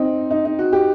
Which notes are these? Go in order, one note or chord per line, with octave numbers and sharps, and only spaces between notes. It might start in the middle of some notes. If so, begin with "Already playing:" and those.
Already playing: C4 D#4
D#4
D#4
F#4
G4